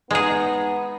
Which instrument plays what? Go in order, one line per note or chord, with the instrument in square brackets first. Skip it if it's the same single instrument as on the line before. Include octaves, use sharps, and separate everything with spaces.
[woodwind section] E2 D#4 [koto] G#3 G#4 [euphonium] B3